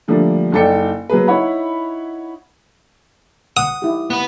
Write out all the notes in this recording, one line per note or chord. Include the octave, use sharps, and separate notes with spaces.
D3 F3 G3 A3 A#3 D4
F#1 D#4 A4 D5 G5 C#7
F#3 A#3 G#4 B4
D#4 E4 C#5 F#5 B5
F#5 D#6
D#4 E4 G4
B3 B4